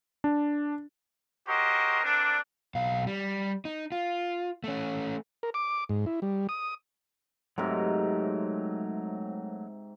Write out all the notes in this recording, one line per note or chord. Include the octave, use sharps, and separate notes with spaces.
D4
C#4 F#4 G4 A#4 C5 D#5
A3 A#3 C4 D4
B1 F5
G3
D#4
F4
A3 C#4
A#4
D6
G#2
E4
G3
D#6
G#2 C3 F#3 A3 A#4